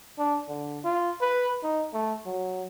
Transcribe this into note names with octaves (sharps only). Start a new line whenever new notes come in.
D4
D3
F4
B4
D#4
A3
F#3